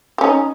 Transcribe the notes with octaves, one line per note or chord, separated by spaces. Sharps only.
C#4 D#4 G4